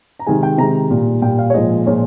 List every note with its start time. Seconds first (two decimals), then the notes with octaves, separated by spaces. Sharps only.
0.19 A#5
0.26 C3 D#3 G#3 G#5
0.43 G5
0.58 C3 D#3 G#3 A#5
0.90 A#2 G3
1.22 A#2 G3 G5
1.39 F5
1.50 C#5
1.54 A#2 F3 G#3 D#5
1.87 A#2 F3 G#3 C#5